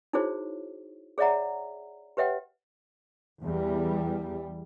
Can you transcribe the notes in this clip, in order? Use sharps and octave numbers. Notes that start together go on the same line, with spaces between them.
D#4 E4 F#4 G#4 C5 C#5
G#4 C#5 D5 E5 F#5 A#5
G4 B4 C#5 E5 F#5 G5
E2 G3